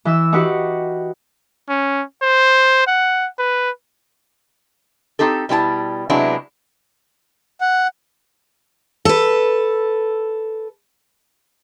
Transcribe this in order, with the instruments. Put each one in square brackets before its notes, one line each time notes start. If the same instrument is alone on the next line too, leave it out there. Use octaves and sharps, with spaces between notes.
[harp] E3 E5 E6
D#4 F#4 G4 B4 F#5
[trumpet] C#4
C5
F#5
B4
[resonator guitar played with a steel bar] C4 D#4 G4 A4
B2 G3 E4 A5
C3 F#3 G#3 B3 D4 E4
[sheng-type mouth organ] F#5
[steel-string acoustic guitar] A4 B4